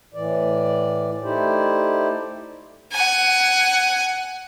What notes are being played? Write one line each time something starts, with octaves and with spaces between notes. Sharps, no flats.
A2 E3 D5
A3 D#4 E4 G4 C5 D5
F#5 G#5